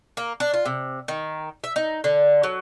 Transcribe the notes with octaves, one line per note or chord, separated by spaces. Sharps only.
A#3
D4
F4
C3
D#3
E5
D#4
D3
F#3